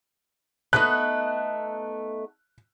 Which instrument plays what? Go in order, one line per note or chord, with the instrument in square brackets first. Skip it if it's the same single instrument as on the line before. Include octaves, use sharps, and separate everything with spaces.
[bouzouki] A3 B3 D#4 [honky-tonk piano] F#6